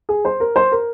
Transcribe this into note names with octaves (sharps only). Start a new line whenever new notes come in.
G#4
C5
A#4
C5
A#4